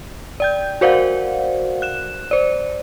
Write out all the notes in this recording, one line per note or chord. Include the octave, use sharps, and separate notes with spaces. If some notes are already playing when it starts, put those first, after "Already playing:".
D5 G5 G6
F#4 A#4 C5 D5 F5 F#5
F#6 E7
C5 D5